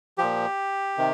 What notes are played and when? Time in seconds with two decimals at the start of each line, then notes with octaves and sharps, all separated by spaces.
0.18 A#2 F3 G4
0.98 C3 D#3